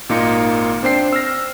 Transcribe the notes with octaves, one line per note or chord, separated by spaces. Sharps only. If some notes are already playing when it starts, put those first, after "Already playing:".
G#1 A#2 A#3 D#4 F4 C#7
C4 D4 C5 G5 C7
E6 F6 A#6